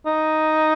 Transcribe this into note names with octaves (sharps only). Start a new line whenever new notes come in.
D#4